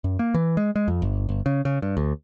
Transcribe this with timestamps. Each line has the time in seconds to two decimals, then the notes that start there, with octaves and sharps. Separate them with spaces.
0.04 F#2
0.19 A#3
0.34 E3
0.57 G#3
0.76 G#3
0.88 F2
1.02 G1
1.29 G1
1.46 C#3
1.65 C#3
1.82 G2
1.97 D2